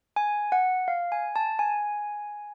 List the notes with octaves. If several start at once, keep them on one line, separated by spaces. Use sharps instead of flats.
G#5
F#5
F5
G#5
A5
G#5